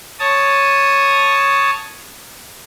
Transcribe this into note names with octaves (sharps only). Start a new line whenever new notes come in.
C#5 A5 D#6